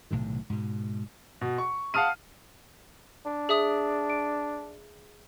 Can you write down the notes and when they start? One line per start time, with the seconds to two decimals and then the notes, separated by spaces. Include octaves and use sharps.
0.11 B1 A2 C3 D#3
0.50 G#2 B2
1.41 B2
1.58 C#6
1.94 F5 F#5 A5 D#6 F6 D#7
3.26 D4
3.49 G#4 E5 D#6
4.10 D7